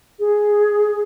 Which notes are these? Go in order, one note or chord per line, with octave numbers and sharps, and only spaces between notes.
G#4